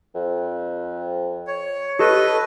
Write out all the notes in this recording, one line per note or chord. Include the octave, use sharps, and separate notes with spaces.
F2
C#5
G4 A4 B4 D#5